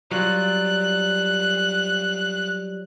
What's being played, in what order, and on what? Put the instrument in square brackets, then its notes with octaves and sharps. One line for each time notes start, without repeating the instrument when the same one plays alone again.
[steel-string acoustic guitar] F#3 G3 F4 [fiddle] F#6